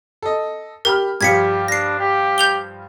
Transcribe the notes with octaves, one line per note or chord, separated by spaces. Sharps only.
A4 D#5
G4 A#4 B5 F6
G2 F3 G3 G4 G#6 B6 C#7
D4 A#6 C7
G4
G6 F7 G7